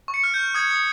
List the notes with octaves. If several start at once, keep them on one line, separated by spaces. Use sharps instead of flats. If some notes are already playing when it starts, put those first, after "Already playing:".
C#6
C#7
F6
G6
F6
D#6 G#6
D#6